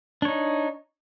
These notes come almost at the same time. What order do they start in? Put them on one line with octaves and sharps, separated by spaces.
D4 C#5 D#4